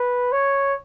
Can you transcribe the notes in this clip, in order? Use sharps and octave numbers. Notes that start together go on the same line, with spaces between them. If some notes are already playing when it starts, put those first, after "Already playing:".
Already playing: B4
C#5